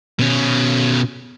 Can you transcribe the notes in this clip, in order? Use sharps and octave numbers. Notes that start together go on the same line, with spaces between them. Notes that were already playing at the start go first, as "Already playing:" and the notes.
B2 C#4